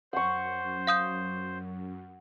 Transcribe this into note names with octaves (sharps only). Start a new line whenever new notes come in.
F#2 C5 F#5 C#6
F5 D#6 G6